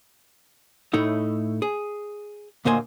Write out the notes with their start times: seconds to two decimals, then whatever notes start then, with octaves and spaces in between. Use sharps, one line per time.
0.93 A2 A3 D#4 E4
1.62 G#4
2.65 D2 A#2 A#3 C5 D#5 G#5